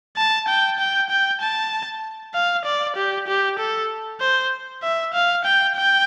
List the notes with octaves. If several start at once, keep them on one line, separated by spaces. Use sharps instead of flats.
A5
G5
G5
G5
A5
F5
D5
G4
G4
A4
C5
E5
F5
G5
G5